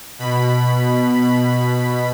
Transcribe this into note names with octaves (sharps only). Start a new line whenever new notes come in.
B2 B5